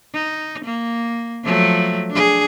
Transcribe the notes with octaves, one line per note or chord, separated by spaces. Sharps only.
D#4
A#3
F3 F#3 A3
D4 G#4